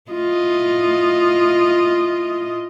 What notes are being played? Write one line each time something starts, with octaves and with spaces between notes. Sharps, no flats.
E4 F4 D#5